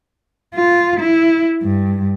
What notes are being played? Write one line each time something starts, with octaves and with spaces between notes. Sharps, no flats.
F4
E4
G2